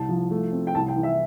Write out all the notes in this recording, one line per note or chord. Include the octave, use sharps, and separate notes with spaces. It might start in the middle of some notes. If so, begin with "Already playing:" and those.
Already playing: C2 A5
F3
A3
C4
G5
C2 A5
G5
E3
E5